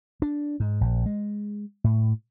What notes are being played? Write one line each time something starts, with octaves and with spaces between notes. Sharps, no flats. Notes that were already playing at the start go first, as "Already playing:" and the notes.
D4
G#2
A#1
G#3
A2